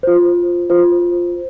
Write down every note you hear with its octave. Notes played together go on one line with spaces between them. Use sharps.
F4 C5
F4 C5